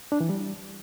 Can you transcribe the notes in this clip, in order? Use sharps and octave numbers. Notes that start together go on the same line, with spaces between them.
D4
E3
G3